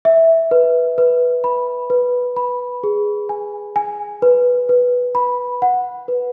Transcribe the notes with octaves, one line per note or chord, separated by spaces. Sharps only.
E5
B4
B4
B5
B4
B5
G#4
G#5
G#5
B4
B4
B5
F#5
B4